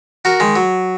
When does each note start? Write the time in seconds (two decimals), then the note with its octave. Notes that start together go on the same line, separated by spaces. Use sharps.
0.25 F#4 A#4
0.40 D#3 G#3
0.56 F#3